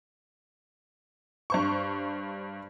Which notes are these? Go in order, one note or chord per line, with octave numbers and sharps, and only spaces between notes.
G2 C5 C#6